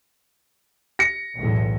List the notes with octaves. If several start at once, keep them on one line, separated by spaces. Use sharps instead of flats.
A#6 C#7
B1 E2 A2